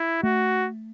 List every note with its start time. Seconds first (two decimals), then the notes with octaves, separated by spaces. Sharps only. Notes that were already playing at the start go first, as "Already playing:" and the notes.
Already playing: E4
0.23 A3 F#4